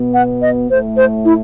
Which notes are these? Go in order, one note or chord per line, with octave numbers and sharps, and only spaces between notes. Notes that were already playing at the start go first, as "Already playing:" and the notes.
Already playing: B2 B3
F#5
D#5
A2 A3 C5
C5
E4